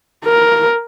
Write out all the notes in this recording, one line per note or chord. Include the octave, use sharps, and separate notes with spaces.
A#4